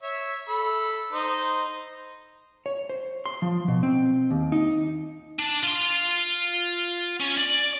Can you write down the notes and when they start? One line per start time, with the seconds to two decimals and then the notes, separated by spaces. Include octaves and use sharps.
0.03 C#5 E5
0.49 A4 B5
1.13 D#4 C5 D#5
2.66 C#5
2.89 C5
3.26 C6
3.42 F3
3.68 B2
3.83 C4
4.31 D#2
4.52 D#4
5.39 D4
5.63 F4 C6
7.20 C#4
7.37 D5